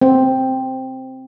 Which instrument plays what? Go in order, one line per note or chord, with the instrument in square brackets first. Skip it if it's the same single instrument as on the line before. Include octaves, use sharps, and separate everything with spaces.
[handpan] C4